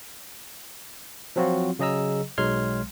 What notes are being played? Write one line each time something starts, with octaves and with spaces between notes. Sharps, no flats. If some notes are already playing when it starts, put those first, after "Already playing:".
F3 F#3 C4 F4 F#4
C#3 F#3 G#4 D#5 A#5 E6
B1 F#3 G#3 C6 F6 G#6